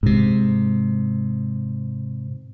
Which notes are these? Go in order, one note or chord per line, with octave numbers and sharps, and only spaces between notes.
G#2 C3